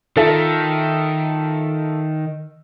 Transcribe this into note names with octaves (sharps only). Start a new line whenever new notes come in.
D#3 F4 A4 E5